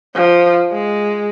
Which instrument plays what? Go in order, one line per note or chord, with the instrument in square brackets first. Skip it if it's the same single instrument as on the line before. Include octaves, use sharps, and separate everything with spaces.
[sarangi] F3
G#3